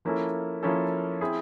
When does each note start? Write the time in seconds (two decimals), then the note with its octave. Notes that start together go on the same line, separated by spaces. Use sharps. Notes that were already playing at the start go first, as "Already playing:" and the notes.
0.05 F3 A#3 C#4 E4 A4
0.63 F3 A#3 C#4 E4 A4
1.21 C4 E4 G#4